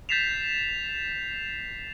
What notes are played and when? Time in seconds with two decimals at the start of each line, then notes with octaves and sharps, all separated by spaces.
0.09 G6 A6 B6 C7 E7 F7